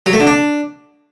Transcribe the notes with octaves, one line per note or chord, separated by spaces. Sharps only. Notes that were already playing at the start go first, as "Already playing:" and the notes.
F#3
A3
D3
D4